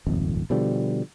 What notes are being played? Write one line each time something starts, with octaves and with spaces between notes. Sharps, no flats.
D#1 G#1 F2
B2 D3 F3 G3